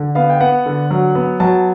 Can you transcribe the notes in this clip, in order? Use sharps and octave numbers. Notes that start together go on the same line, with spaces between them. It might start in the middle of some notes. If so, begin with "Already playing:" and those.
Already playing: D3
B3 F5
G5
B3 F#5
D3
F#3
B3
F#3 A5